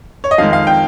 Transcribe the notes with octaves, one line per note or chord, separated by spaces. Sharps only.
C#5
D#5
F2 D#3 G#3 F5
F5
G5